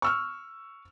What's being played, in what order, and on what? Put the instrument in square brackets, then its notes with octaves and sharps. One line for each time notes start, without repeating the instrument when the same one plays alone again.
[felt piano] C#6 E6 F6